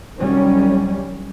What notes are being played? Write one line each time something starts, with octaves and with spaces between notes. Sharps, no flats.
C2 D#3 F#3 G3 C#4